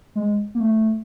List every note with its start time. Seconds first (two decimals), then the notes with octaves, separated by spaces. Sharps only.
0.15 G#3
0.55 A#3
0.60 A3